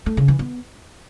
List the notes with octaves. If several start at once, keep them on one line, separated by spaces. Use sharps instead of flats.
A3
C#3
E3
B3